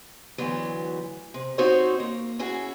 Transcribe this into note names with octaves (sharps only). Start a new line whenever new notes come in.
D2 E3 F#3 B3
C3
C4 D#4 F#4 C5 C#5
A#3
C#4 E4 F#4 G#4